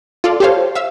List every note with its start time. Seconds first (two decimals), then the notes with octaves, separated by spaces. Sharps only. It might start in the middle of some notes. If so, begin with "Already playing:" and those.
0.24 F4 A4 D5
0.40 G4 A4 C5 C#5 F5
0.75 E5 F5 E6